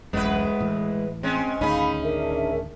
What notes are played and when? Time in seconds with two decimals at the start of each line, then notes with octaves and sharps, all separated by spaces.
0.13 D1 A1 F#2 G#3 B3 E4 B4
0.60 A2 E3
1.23 G#3 C4 C#4
1.61 D2 A2 D#3 C#4 D#4 G#4 F5 B5
2.02 D4 A#4 E5